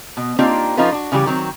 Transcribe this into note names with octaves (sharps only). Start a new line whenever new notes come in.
B2
A#3 C4 D4 D#4 F4 G4
F3 C#4 D#4 F4 A4 B4
D4 F#4
C#3 E3 G3 G4
D#3 F#3 C4